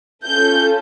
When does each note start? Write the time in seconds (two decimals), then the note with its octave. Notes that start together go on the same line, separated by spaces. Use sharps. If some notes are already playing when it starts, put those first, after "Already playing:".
0.25 C#4 F4 A4 G6